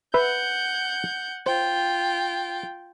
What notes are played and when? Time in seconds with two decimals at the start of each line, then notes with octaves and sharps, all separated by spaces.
0.14 B4 E5 F#5 G6
1.46 F4 C5 G5